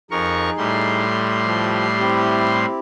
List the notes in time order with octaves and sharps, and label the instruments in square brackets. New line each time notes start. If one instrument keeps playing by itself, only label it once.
[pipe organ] F2 A#4 C#6 [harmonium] D#4 G#4
[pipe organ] A2 G3 C6
[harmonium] F3 G4
C4 E4 G4